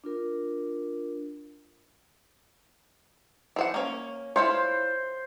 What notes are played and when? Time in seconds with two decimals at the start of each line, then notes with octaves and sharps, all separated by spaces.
0.04 D4 F4 A#4
3.56 E3 C5 F#5
3.74 A#3 C#4
4.36 E4 F4 C5 C#5